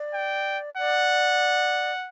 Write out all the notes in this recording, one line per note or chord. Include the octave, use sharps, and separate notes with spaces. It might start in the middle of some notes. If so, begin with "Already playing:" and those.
Already playing: D5
G5
D5 F#5